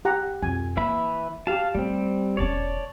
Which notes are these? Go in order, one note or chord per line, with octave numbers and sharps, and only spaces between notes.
G4 F#5 A#5
F2 B2 G#5
E3 A#3 E5 B5
F#4 G4 F5 A5
G3 A3 C4
E1 C#4 C#5 D5 A5